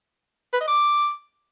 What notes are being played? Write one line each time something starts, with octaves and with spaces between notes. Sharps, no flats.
B4
D#5
D6